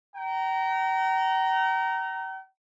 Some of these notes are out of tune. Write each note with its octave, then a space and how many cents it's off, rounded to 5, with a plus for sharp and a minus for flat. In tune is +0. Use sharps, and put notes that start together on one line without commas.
G5 -45 A#5 +0